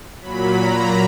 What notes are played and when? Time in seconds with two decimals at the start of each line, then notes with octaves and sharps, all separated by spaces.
0.21 A#2 F#3 B5
0.56 A#5